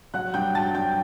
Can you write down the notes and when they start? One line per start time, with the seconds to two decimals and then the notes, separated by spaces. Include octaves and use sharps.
0.14 F#3 F#5 F#6
0.34 G2 G5 G6
0.55 F#3 A5 A6
0.75 G2 G5 G6